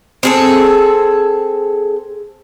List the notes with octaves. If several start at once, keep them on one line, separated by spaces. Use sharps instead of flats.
C4 G#4 A4